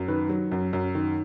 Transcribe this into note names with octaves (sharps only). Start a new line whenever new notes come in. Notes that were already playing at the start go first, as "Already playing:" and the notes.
Already playing: F#2
D#3 B4
F#3
F#2
F#2
D#3